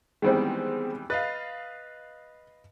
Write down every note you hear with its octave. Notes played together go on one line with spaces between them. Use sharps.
D#3 E3 G3 G#3 B3 C4
B4 D#5 F5 A6